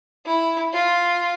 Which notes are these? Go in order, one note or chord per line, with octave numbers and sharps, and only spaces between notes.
E4
F4